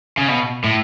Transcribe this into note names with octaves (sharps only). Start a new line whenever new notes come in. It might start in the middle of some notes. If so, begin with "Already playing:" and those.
C#3
B2
A2